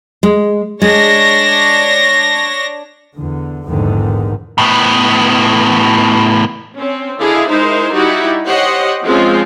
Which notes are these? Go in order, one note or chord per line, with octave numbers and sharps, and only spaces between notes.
G#3
G#3 D4 C#5 A#6
E2 D3
A#1 E2 G#2 D3 D#3
A2 B3
C4 C#4
D3 E4 G#4 D#5 F5
G#3 D#4 E4 A#4 C5
G3 D#4 E4 F#4 G4
G4 C5 C#5 D#5 F#5
F3 G#3 C4 C#4 F4 C5